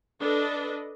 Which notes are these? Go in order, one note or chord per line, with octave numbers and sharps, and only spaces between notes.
D4 A4 B4 D#5